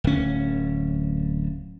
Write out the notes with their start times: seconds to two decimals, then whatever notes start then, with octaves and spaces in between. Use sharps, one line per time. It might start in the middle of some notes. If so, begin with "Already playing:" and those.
0.04 D1 C#4